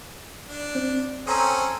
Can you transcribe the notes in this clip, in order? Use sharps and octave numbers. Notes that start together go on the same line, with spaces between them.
D4
C4
C4 C#4 A4 A#5 C6 D#6